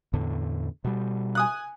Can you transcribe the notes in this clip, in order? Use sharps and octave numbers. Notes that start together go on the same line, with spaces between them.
E2 A2 D3
B2 G3
G#5 D#6 F#6